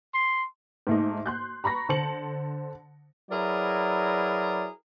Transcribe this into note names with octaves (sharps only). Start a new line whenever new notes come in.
C6
G#2 A3 D#4
C6 F#6 G6
A#5 B5 C#6 A#6
D3 C5 A5 C#7 F#7
F#3 E4 G#4 A#4 B4 D5